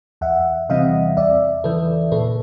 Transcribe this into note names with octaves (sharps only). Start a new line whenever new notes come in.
E2 E5 F#5
C3 E3 G3 C4 D#5 F5
E2 D5 E5
C#3 E3 A4 B4
A#2 A4 B4